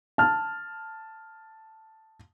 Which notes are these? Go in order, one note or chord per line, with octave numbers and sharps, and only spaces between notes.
A5 F6